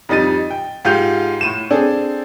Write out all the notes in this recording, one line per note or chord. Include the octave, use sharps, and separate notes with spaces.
F2 G3 D#4 A6 D#7
G5
G#2 F4 G4 G6 F7
A2 D#7 E7
C4 D4 G#4 A4